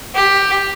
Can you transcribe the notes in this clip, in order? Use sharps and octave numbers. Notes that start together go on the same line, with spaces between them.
G4